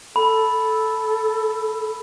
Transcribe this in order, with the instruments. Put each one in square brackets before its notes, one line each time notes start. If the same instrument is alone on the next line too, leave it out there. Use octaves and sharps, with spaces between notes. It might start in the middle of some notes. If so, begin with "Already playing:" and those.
[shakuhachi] A4 [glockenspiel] B5